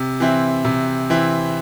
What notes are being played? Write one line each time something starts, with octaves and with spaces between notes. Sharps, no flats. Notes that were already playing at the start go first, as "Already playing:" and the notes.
Already playing: C3
E3 C4 E4
C3
E3 C4 E4